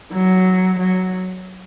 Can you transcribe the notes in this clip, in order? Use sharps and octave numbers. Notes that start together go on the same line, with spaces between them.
F#3
F#3